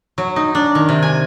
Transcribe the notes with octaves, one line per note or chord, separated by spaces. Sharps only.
F#3
D#4
D4
D#3
C3
G#5